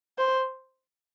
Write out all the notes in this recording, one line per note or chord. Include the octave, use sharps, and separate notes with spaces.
C5